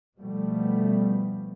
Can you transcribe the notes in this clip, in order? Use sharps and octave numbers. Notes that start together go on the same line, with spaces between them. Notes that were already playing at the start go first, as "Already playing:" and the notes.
B2 F3 G3 A3 B3